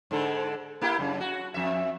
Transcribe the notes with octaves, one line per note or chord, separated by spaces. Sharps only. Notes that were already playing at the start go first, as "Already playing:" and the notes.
G#2 D3 A4
A#3 E4 G4
F#2 C#3
F#4
F2 E5